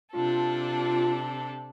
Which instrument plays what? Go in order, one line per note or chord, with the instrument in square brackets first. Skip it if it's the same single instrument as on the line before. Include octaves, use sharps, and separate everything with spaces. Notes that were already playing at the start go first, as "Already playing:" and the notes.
[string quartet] C3 D4 A4 [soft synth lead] F4